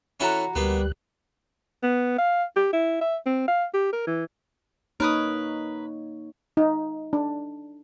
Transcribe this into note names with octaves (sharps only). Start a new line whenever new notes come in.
E3 C#4 E4 F#4 A4 A#5
D2 G3 A#3 B3 F#6
B3
F5
G4
E4
E5
C4
F5
G4
A#4
E3
A#3 D#4 A#4 B4 C#5 D#6
D#4
D4